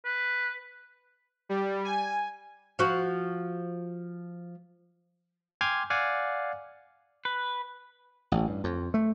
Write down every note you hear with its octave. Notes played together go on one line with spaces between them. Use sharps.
B4
G3
G#5
F3 F#4
G5 G#5 C6 D6 F6 G#6
D5 F5 F#5 G#5
B4
A1
G2
F2
A3